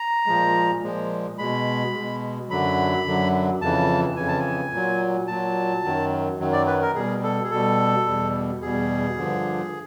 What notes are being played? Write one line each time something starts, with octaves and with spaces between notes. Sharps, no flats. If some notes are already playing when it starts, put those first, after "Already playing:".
Already playing: A#5
A#2 F3 G#3
A#2 F3 G#3
B2 G#3 B5
B2 G#3
F#2 D3 F#3 B5
F#2 D3 F#3
F2 C#3 E3 A5
F2 C#3 E3 G#5
A5
G#5
A#2 F#3
A#2 F#3 A5
F#2 D#3 F#3
F#2 D#3 F#3
D5
B4
A#4
B2 G3 G#4
A4
G#4
B2 G3 A4
E2 B2 G3
E2 B2 G3 G#4
G2 D3 F3